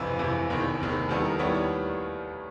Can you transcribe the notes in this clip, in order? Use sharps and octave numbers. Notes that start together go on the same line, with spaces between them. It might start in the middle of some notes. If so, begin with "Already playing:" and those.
Already playing: G1 F2 C3 E3 B4
G1 F2 C3 E3
F#1 E2 C3 D#3
F#1 E2 C3 D#3
D#2 D#3 G3 B3 E4 A4
A#4
D#2 D#3 G3 B3 E4 C#5
D5